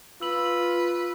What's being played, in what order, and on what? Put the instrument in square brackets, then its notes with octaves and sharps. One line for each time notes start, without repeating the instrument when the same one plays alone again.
[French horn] F4 [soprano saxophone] B4 [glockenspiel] E6 F#7